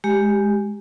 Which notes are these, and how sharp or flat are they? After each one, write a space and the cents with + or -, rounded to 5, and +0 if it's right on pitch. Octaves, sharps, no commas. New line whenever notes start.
G#3 +0 G4 +0